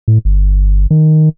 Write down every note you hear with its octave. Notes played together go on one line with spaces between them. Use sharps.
A2
G1
D#3